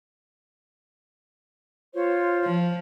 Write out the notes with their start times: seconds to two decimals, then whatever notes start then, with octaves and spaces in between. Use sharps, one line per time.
1.93 F4 C5 C#5
2.44 F3